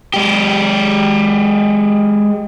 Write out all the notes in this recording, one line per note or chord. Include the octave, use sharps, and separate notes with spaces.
G#3 G4